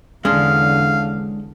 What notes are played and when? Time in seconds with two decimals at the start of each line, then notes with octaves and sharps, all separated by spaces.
0.25 E2 D3 G#3 C#4 D4 F5